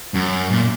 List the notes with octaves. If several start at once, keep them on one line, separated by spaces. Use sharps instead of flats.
F#2
A#2